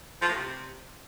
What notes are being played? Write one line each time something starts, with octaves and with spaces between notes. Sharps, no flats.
F3
A2
C3